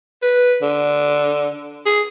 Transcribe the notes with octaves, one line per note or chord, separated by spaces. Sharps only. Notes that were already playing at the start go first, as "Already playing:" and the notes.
B4
D3
G#4